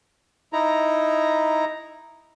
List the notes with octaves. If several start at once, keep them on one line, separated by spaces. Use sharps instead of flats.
D#4 E4 A#5